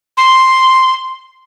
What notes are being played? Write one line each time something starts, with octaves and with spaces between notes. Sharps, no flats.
C6